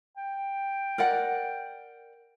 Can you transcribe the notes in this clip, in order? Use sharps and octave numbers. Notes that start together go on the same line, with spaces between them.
G5
A#4 D5 F#5